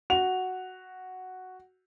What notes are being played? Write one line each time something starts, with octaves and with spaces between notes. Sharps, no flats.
F#4 F7